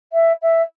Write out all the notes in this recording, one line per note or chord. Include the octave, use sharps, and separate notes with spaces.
E5
E5